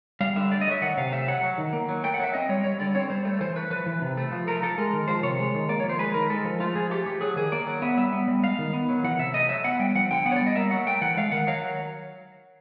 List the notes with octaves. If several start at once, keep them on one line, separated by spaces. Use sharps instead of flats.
G3 F5
D3 E5
A3 D5
D#5
F#3 E5
D#3 F#5
C3 F5
A3 E5
F#3 F#5
F#3
D#3
A#3
F#3
A3 G5
F#5
F#3 E5
C4 D#5
G3 C#5
G3 C#5
D3 D5
C4 C#5
G3 C5
A3
E3 C5
A3 B4
F3 B4
E3
C3
A3
F3
A3 A#4
F3 A4
G#3 A#4
D#3
F3 C5
C3 C#5
G#3
D#3
A#3 D5
F3 C#5
C5
G#3 B4
D#3 A#4
G#3 A4
F3
A3 F4
F3 G#4
A3 G4
F3 G4
F#3 G#4
D#3 G#4
A#3 D5
F#3
B3 E5
G3 E5
B3
G3
G#3 F5
D#3
B3
F#3
E3 F#5
C3 E5
A3 D#5
F#3 E5
B3 F#5
G3 G5
F3 F#5
D3 G5
B3 F#5
C#5
D5
G3
D#5
A#3 E5
F#3 F#5
A3 G5
E3 F#5
G#3 F5
D#3 F#5
F#3 F5